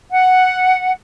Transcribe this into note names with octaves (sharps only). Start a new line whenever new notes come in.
F#5